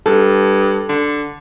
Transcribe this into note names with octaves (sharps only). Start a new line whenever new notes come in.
G2 A4
D3